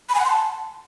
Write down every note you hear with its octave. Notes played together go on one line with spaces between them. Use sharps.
B5
G#5
F#5
C6
A5